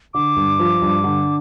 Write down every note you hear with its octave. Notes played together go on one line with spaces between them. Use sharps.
D3 D6
G2
F3
G2
D3